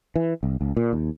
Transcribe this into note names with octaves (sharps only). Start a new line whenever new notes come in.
E3
C2
C#2
A#2
D#2